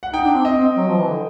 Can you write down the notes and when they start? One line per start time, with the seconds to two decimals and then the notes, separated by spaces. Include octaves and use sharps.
0.03 F#5
0.13 D#4 G5
0.24 D4
0.34 C4
0.45 C4 D#5
0.56 C4
0.77 F#3
0.87 F3
0.98 E3
1.08 D3